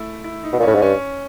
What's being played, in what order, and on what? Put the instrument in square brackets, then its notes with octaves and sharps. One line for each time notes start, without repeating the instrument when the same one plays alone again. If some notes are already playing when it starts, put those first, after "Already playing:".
Already playing: [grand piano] A3 E4
E4
D#4
[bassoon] B2
A#2
[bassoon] A2 [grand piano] C#4
[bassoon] G#2
[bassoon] G2 [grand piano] C#4